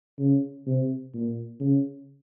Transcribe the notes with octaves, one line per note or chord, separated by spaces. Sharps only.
C#3
C3
A#2
C#3